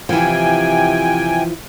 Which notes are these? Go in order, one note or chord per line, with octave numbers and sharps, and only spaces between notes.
C3 E3 F3 G5 G#5